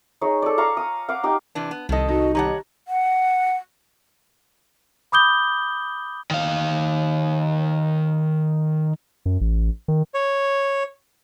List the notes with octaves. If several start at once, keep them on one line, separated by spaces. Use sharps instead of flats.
D#4 G#4 C#5
A4 D5
F5 A#5 C#6
D#6
F5 F#5 D6
D#4 G4 D#5
C3 E3 D4
B3
C2 D#3 A4 D#5
D#4 F#4
D#3 G4 C#5 F#5 A5 A#5
F#5
B5 D6 D#6 G6 G7
D#3 F5
F#2
A1
D#3
C#5